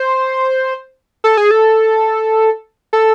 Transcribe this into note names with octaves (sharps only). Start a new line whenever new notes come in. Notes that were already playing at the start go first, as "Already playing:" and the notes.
Already playing: C5
A4
G#4
A4
A4